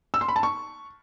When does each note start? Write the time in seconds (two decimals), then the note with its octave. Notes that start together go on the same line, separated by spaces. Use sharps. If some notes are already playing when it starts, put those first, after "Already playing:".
0.14 E6
0.21 C6
0.28 B5
0.36 A5
0.43 C#6